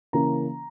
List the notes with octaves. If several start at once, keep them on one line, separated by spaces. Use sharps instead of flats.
C#3 E3 A#3 C#4 A#5